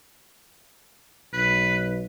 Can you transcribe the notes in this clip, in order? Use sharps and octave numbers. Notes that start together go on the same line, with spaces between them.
B1 B4